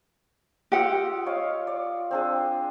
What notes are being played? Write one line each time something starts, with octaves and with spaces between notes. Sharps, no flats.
F4 G4 F#5 D#6 E6
C#5 D#5 F5
D5
C4 D4 G#4